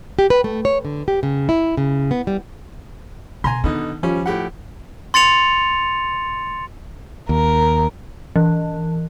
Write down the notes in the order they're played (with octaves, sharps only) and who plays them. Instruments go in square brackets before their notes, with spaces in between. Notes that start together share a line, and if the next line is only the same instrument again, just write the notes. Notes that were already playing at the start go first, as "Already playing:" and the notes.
[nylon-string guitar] G4
B4
A3
C#5
D3
G4
C#3
E4
C#3
B3
G3
[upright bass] B2 [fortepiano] G#5 A#5 C6
[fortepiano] B2 D3 D#4 [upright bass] D#3
[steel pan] F3 [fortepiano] G3 C#4
[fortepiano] A2 G4 F#5
[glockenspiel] C6 A6 C#7 F7
[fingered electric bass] D#2 [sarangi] A#4
[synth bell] E3